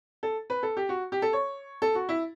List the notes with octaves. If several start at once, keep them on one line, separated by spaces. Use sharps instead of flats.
A4
B4
A4
G4
F#4
G4
A4
C#5
A4
F#4
E4